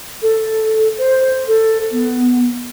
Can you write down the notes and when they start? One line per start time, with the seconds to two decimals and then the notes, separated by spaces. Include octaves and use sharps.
0.22 A4
0.98 C5
1.47 A4
1.91 B3